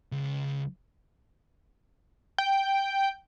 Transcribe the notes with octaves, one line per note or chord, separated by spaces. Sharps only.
C#2
G5